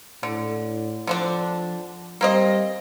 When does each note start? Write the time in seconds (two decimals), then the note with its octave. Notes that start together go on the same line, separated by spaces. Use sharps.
0.23 A2 D3
1.07 D3 F3 C4 D4
2.21 G3 A#3 C4 D#5